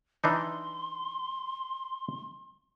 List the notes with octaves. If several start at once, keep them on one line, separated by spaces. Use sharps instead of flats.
E3 D4 D#4 C6